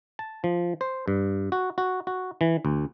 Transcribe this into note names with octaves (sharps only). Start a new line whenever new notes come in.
A5
F3
C5
G2
F#4
F#4
F#4
E3
D2